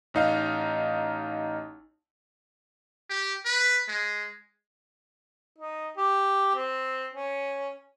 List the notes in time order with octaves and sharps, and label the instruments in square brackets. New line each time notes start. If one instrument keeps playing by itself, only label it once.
[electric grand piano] A1 D#4 F5
[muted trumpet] G4
B4
G#3
[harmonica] D#4
G4
C4
C#4